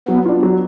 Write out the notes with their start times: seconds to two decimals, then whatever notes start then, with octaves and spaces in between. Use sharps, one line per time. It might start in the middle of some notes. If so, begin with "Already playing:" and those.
0.08 F#3 B3
0.26 D4 F4
0.43 F#3